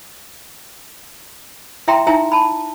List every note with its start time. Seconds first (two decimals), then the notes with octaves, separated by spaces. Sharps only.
1.88 E4 E5 G5 A#5 C6
2.07 D#4 E4 E5 G#5 A#5
2.32 A5 B5